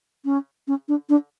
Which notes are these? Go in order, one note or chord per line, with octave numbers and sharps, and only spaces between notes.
C#4
C#4
D4
D4